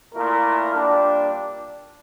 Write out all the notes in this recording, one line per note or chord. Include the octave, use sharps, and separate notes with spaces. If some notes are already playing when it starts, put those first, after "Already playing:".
A#2 A3 E4 A#4
A#2 G3 D4